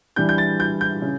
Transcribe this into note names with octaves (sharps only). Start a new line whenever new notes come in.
E3 G3 D4 G6
G6
A6
G6
G6
C#3